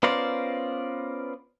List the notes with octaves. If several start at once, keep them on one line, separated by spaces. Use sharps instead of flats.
B3 C#4 F4 A#4 C5 D5